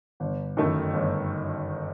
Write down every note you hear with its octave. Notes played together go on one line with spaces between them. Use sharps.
G1
F#2 D#3 A3 E4
G1